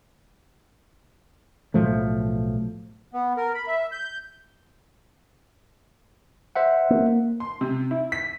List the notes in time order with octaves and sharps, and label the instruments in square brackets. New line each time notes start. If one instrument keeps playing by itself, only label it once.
[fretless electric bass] B1 A2 F3 A3
[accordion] B3
A#4
B5
E5
G6
[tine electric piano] C5 E5 F#5
[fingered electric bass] A#3
[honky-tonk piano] C6
C3
E4
B6